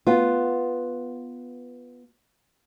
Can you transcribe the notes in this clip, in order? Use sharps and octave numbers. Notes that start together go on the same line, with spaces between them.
B3 F4